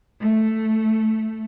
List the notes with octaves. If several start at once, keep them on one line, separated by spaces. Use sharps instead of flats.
A3